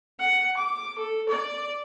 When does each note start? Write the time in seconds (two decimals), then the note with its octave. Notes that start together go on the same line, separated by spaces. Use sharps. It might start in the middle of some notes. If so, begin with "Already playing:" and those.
0.20 F#5
0.57 D6
0.98 A4
1.29 D5